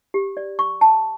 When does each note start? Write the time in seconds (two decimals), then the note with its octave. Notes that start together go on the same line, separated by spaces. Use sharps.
0.14 G4
0.37 D5
0.59 C#6
0.81 A5